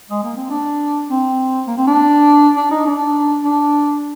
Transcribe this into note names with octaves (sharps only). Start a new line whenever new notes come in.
G#3
A#3
C4
D4
C4
A#3
C4
D4
D4
D#4
D4
D4